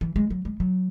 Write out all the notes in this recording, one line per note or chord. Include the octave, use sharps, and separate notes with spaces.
E3
G#3
F#3
G#3
F#3